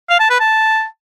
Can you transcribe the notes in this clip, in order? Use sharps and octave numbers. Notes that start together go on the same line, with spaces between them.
F5
A5
B4
A5